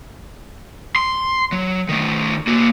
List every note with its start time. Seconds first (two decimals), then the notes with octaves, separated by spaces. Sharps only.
0.96 C6
1.52 F#3
1.89 D#3 A3
2.47 A#3 F#4